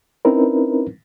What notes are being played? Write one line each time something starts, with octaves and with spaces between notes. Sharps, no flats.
C4 C#4 D#4 E4 A#4 B4